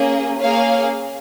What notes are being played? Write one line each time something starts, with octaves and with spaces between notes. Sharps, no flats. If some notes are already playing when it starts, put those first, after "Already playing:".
Already playing: A#3 C#4 G#4
A#3 C#4 G#4 C#5 F5